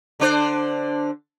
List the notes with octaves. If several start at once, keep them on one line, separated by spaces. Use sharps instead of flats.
D3 D4 C5